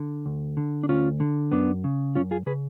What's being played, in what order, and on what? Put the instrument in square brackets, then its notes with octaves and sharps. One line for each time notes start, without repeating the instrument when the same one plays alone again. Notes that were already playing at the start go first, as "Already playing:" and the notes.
Already playing: [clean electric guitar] D3
D2
D3
D4
D2 C#4 F4
D3
F#2 B3 D4
C#3
F#2 C#4 F4
F4 G#4
C#3 G#4 B4